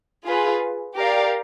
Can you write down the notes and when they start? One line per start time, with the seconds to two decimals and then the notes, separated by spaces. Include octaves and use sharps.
0.23 F4 G#4 B4
0.96 G4 A#4 D5 F5